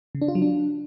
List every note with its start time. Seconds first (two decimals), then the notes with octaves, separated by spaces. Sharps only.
0.15 C#3
0.21 D4
0.28 F4
0.35 F#3
0.42 D4